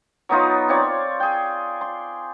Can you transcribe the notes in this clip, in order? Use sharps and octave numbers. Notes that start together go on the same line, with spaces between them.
F#3 B3 D#4 F4
C4 F4 C#5 D5
G#4 G5
C6